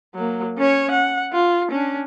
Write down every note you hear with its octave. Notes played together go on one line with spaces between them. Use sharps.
F#3 A#3
C#4 C#5
F#5
F4
C#4 D4